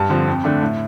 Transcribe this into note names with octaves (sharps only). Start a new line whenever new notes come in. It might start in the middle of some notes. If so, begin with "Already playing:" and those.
Already playing: G2 A5
D3 F3 C4
F2
D3 A3 D4
A2